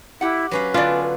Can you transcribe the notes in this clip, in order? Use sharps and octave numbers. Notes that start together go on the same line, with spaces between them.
E4 G4 F#5
F#3 C#4 B4 F5
D3 B3 C#4 D4 F4 D5